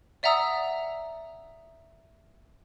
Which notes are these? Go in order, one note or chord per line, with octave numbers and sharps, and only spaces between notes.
D5 E5 F#5 A#5 D#6 E6